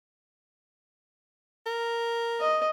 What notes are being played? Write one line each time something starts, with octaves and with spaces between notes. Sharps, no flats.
A#4
D#5